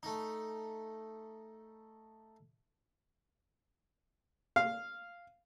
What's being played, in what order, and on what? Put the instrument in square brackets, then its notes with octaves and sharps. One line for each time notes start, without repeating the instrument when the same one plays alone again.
[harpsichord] A3 D#4
[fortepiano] F5